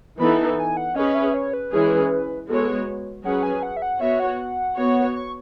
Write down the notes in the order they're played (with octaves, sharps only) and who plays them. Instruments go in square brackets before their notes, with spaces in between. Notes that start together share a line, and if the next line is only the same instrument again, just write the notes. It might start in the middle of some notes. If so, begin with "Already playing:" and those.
[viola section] E3 B3 D#4 A4 [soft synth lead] B5
[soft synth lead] G#5
F#5
[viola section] C#4 G#4 B4 [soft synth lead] D#5
[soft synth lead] E5
C#5
B4
[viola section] E3 G#3 C#4 G#4
[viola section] G#3 B3 F#4 C#5 [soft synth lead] A4
[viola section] F#3 C#4 G#4 B4 [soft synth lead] F#5
[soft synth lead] G#5
F#5
E5
F#5
[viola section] B3 F#4 C#5 [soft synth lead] E5
[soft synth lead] F#5
[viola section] B3 F#4 C#5
[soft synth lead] C#6